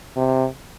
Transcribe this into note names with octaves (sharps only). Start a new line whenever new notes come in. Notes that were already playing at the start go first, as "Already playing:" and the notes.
C3